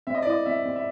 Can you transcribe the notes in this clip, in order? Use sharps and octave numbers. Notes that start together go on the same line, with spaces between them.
C4 E5
D#5
D5
E4 D#5
C4 E5
C4
E5